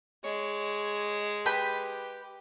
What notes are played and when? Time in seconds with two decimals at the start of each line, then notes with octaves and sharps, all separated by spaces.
0.25 G#3 C#5
1.46 G4 B4 G5 B5